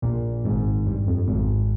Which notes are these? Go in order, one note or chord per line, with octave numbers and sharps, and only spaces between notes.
A#1 A#2
G#1 G#2
G2
F2
G#1 G#2